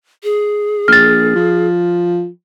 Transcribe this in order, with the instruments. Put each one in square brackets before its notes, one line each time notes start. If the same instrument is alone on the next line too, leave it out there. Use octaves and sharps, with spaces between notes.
[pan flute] G#4
[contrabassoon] A#1 [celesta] F6 A6
[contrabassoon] F3